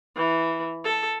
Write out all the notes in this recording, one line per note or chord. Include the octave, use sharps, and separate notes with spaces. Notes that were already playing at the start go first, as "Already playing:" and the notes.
E3
A4